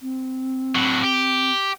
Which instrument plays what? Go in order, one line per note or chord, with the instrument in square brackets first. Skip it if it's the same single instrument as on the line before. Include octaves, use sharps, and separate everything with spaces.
[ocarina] C4
[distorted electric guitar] A2 F#3
G4